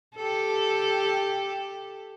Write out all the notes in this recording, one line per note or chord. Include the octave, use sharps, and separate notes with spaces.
G4 A4